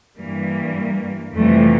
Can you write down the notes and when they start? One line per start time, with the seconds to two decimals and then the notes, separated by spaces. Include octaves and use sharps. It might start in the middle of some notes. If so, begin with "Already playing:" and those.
0.18 G2 E3 G3 A#3
1.35 F2 C3 E3 G3 A3